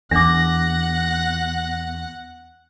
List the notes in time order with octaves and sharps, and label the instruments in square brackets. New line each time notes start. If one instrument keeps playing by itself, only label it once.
[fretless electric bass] E2 [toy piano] D4 D6 [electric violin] F#5 [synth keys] A#6